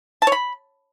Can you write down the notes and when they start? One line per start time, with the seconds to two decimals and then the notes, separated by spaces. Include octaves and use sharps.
0.22 A5
0.27 C#5
0.32 B5